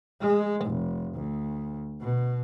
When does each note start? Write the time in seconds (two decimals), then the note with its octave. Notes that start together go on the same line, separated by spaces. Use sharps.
0.21 G#3
0.65 F1
1.14 D2
2.01 B2